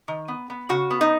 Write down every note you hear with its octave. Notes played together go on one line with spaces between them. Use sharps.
D#3
B3
B3
C#3 F#4
B3
D#4